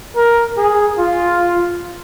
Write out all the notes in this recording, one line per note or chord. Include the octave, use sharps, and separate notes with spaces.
A#4
G#4
F4